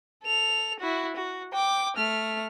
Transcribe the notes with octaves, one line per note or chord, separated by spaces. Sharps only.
A4 F7
E4 F#4
F#4
G5 D6
A3 F6